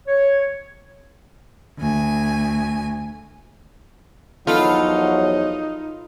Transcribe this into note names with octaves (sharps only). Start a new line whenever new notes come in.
C#5
D2 G#5
E2 F3 F#3 D#4 F4 A4 B4 B5